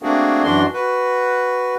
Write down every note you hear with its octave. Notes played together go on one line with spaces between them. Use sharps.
A3 A#3 C4 D4 F#4 G#4
F#2 E3 D4 F#4 C6
F#4 B4